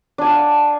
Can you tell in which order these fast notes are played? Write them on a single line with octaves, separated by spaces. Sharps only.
D4 G#5 F5 F#5